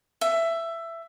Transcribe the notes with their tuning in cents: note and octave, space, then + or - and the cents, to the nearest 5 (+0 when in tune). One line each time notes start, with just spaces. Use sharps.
E5 +15